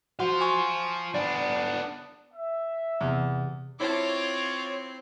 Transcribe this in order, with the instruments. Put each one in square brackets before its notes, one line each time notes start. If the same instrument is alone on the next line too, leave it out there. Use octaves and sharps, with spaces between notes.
[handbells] F#4 F#5 C6 [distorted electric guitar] C5 F5
[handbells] G#5 C#6
[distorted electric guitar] B3 D4 [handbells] D5
[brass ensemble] E5
[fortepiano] E2 [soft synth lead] C3
[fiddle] C4 [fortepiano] E4 C5 A5 [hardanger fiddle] F4 D6 [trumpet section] C#5